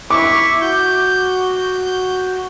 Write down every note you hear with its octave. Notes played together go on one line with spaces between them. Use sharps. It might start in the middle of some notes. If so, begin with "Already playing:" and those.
E4 C#6 D6
F#4 G6